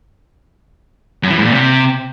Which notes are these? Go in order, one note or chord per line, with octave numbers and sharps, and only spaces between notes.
F#2
E3
G#2
A#2
C3